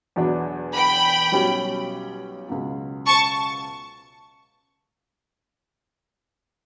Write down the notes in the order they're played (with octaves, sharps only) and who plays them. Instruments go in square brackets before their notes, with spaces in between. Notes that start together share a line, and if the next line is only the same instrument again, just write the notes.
[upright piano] E2 B2 F#3 B3 D4
[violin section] G5 B5
[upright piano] B1 B2 G3 C#4 G4
C#2 B2 F#3
[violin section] A5 C#6